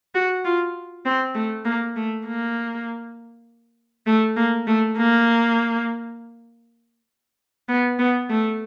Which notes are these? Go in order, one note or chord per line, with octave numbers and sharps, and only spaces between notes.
F#4
F4
C4
A3
A#3
A3
A#3
A3
A#3
A3
A#3
B3
B3
A3